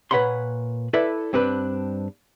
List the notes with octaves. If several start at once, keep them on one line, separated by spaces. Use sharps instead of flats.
A#2 B4 C#5 F#5 B5 C6
E4 A4 B4 D5 E5
G2 C4 D4 B4